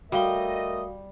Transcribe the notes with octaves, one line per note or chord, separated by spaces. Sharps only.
G3 A3 F#4 A#4 D#5 F5 G7